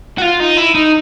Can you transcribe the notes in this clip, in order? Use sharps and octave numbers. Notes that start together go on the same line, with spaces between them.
F#4
F4
D#4
E4
D#4